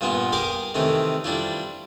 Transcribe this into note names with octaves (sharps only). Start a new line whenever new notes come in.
G2 A#2 A#3 B3 F4
G4 G#4 A#4 G#5 D6 D#6
C3 D#3 E3 A3 C#4
G3 D4 E4 F4